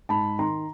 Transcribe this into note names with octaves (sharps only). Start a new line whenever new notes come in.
G#2 A5 B5
D#3 A#5 C6